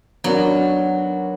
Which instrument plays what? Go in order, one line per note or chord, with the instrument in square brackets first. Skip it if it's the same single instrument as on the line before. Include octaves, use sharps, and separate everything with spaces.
[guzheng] F#3 [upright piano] B3 D4 F#4 A#4